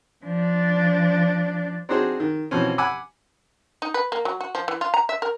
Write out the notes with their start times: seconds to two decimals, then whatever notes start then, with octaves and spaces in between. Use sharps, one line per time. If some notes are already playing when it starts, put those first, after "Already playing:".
0.24 F3 D4
1.89 C4 D4 D#4 F#4 G#4 C5
2.20 D#3
2.51 B2 E3 F3 C4 C#4
2.78 F#5 G#5 B5 D6 E6
3.82 D#4
3.94 B4
4.12 A#3
4.25 F#3
4.41 F#4
4.55 F3
4.68 E3
4.81 F4
4.94 A#5
5.09 E5
5.22 A#4